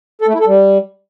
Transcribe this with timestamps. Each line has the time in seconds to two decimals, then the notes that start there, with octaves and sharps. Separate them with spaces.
0.22 A4
0.28 A3
0.34 E4
0.40 A4
0.47 G3